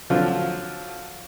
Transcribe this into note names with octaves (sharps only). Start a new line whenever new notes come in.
D3 F3 F#3 F4